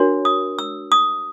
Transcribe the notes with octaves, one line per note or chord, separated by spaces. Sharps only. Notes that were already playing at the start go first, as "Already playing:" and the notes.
Already playing: D4 F#4 A#4 C#5
D#6
E6
D#6